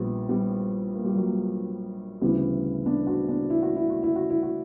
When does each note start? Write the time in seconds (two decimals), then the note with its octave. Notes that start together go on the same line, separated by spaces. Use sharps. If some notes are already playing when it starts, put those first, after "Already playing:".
Already playing: A#1 A#2 G3 B3
0.29 G3 B3
0.94 A#3
1.05 G3
1.15 F#3 A#3
2.21 D2 C#3 E3 G3 B3
2.86 B3 D4
3.07 D4 F#4
3.28 B3 D4
3.50 E4
3.62 F#4
3.76 E4
3.89 F#4
4.03 E4
4.16 F#4
4.30 E4
4.43 F#4